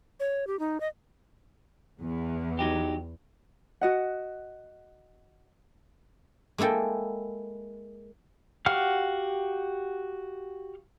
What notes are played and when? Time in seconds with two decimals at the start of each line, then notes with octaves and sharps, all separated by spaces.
0.20 C#5
0.47 G4
0.59 D#4
0.81 D#5
2.01 E2
2.59 F#3 D#4 G4
3.81 F#4 D#5 F#5
6.58 G#3 A#3 E4 A4 G5
8.66 F#4 G4 F5 F#5 F6